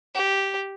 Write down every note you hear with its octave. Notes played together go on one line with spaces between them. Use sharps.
G4